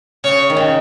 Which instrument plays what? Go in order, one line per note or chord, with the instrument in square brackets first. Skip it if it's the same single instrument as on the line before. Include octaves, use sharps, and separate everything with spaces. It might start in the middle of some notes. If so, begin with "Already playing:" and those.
[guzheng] C#3 [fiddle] C#5
[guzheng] D#3
C#3